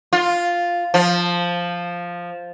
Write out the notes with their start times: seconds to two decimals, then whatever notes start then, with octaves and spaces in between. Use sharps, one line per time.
0.13 F4
0.94 F3